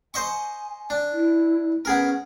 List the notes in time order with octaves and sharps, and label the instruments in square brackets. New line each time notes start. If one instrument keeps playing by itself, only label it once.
[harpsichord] C5 D#5 C#6 [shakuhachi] G#5
[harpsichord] D4
[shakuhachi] E4
[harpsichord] B3 G#4 A#4 [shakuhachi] C#4